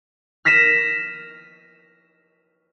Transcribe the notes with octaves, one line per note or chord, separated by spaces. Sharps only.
F6 A#6 B6 D#7 E7